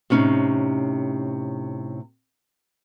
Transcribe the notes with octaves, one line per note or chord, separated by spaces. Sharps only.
A2 C3 C#4 D#4